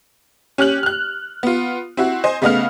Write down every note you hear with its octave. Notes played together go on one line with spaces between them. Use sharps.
C#4 G4 F6 F#6 F#7
F6 F#6
B3 F4
C4 E4 F#4
C5 D#5 G#5
C#3 A3 B3 D#5 F5 F6